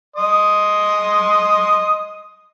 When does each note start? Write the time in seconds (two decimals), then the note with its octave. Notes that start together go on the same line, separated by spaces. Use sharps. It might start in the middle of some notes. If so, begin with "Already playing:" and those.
0.16 D#5 C6 D#6